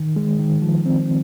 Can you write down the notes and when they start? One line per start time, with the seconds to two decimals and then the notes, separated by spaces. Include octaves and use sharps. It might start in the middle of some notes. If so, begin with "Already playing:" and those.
Already playing: D#3
0.16 G#3
0.39 D#3
0.62 F3
0.86 C4